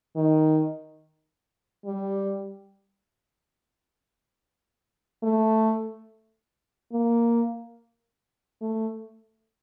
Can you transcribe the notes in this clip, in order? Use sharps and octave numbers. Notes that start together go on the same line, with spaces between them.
D#3
G3
A3
A#3
A3